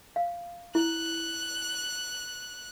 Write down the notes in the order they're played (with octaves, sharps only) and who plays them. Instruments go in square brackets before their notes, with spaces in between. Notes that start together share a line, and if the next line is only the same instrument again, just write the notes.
[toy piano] F5
[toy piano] E4 [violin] F#6